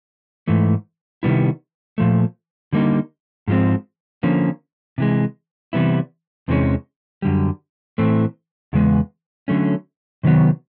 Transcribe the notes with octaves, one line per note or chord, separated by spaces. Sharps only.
G#2 E3 A3
C3 D#3 G3 B3 E4
A#2 F3 A3
D3 G3 A#3 D#4
G#2 F3 G#3 C4
D3 F3 A#3 C#4
C3 E3 G#3
C3 E3 G3 B3 E4
E2 C3 E3 G#3 C#4
F#2 D3 G3
A2 E3 A3 C4
E2 C#3 G#3 B3
D3 F#3 A3 C#4
C3 D#3 F#3 B3